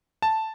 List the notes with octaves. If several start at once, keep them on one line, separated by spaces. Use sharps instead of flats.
A5